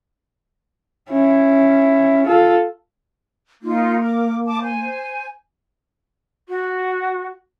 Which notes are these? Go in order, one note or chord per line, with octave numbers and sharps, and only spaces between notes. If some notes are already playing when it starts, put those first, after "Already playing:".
C#4 E4
F4 A4
A#3 D#4 F4
A#4 D6
A5 D6
C5 G#5
F#4